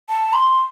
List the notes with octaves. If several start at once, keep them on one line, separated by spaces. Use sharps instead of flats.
A5
C6